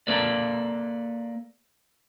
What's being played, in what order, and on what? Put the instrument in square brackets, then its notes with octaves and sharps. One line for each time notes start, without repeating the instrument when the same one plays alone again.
[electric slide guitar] A#3 A4 B4 D5